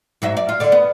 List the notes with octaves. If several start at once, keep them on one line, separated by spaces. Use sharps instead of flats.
G#2 F#3 E5
D5
F4
D3 D5
B3